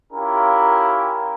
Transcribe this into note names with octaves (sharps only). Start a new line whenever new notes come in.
C#4 E4 F4 G4 A#4